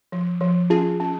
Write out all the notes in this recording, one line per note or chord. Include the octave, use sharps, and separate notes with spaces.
F3
F3
C#4 F4 G#4
C#4